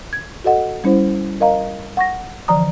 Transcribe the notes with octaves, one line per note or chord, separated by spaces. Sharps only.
G#6
F#4 A4 D#5 F#5
G3 C#4 E4 C5
A#4 D#5 F5 A#5
F#5 C#6 A#6
D3 E3 F3 D5 A#5 D#6